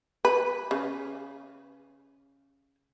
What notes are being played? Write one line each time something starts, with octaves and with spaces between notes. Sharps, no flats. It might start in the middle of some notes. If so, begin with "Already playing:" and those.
B4
C#3